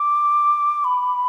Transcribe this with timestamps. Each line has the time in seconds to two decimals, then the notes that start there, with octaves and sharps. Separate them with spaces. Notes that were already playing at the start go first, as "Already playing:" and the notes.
Already playing: D6
0.84 B5